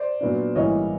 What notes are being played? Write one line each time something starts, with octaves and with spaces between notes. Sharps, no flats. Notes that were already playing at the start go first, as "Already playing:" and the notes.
Already playing: C5 D5
A#2 F#3 B3 D4
A1 G#2 E3 G3 A#3 C#5 D#5